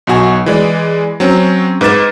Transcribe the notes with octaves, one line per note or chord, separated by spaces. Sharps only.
B1 B2 F#4 G#5
E3 G#3 D5
F#3 C4 C#4
G#2 B4 D6 A6 E7